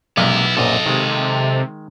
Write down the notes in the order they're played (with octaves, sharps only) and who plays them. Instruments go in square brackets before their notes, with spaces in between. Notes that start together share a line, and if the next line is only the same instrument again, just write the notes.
[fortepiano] B1 [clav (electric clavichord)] C3 G#3 A#3 [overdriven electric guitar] B3 E4
[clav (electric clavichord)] A#1 F#2 A#2 [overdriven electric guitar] A4 D#5
[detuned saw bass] C3 [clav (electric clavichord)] D#3 G#3